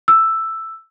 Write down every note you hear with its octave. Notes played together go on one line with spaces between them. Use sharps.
E6